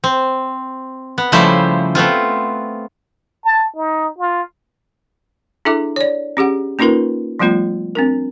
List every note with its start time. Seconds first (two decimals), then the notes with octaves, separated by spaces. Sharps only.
0.04 C4
1.18 B3
1.32 C#3 F3 G3 A3 E4 C5
1.95 A3 B3 C4 F4
3.45 A5
3.76 D#4
4.19 F4
5.65 D4 E4 G#4 A4 E5 D6
5.96 C#5 D5
6.37 C#4 G4 G#4 F#5
6.79 A#3 C#4 D#4 F4 A#4 B4
7.39 F3 G3 A3 B3 F4
7.95 C4 D4 A#4